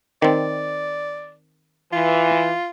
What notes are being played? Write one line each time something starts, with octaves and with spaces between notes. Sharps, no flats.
D#3 C4 D5
E3 F4